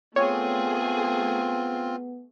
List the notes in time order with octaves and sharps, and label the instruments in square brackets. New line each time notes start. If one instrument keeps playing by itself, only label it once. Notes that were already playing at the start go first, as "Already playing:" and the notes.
[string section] A3 G#4 [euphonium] B3 [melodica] C4 F4 [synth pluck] C#5